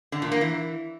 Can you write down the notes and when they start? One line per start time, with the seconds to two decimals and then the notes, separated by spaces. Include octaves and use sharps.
0.12 D3
0.22 A#2
0.32 A#3
0.41 E3